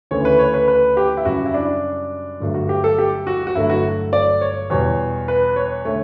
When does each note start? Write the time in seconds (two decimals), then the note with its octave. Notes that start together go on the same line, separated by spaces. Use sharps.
0.11 D2 C#3 E3 A3 C#5
0.25 B4
0.39 C#5
0.54 B4
0.68 B4
0.97 G4
1.17 E4
1.25 F#2 C#3 G3 F#4
1.46 E4
1.54 D4
2.40 G1 G2 F#3 A3
2.54 F#4
2.69 G4
2.84 A4
2.98 G4
3.27 F#4
3.47 F#4
3.55 G1 G2 F#3 A3 E4
3.70 F#4
4.13 D5
4.41 C#5
4.70 E2 B2 G3 C#5
5.28 B4
5.56 C#5
5.85 D3 A3 C#5